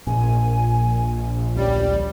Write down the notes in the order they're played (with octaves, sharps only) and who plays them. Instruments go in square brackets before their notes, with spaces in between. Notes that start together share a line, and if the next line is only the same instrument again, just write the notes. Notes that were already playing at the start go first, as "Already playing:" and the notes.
[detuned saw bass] A#1 [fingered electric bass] A#2 [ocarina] G#5
[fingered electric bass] D2 C#4 [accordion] G3 [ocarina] D5